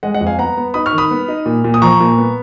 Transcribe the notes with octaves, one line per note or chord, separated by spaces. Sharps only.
G#3 D#5 F#5
D#5 F#5
F2
F5 G#5
B3 F#5 A#5
B3
D#4 B5 D#6
C#6 F6
D#3
B5 D#6
B3
D#4
A#2
A#2
D#6
F3 A#5 C#6
A#2
B3